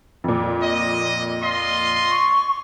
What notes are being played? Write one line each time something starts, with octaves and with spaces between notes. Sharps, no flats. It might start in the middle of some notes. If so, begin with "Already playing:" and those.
F2 A#2
D#5
F4 D#5 C6
C#6